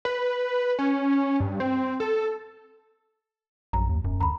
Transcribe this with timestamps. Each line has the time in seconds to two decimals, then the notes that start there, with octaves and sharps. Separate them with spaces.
0.05 B4
0.79 C#4
1.40 G2
1.60 C4
2.00 A4
3.73 A#1 F#2 A#5
3.89 D#2
4.04 E1 F#2
4.20 D2 A#5 B5